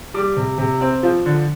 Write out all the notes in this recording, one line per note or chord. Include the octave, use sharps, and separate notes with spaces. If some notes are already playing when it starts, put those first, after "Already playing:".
G3 D6
C3
C3
C4
F3
D3